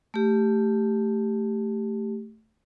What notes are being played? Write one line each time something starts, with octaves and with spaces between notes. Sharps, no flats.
A3 G4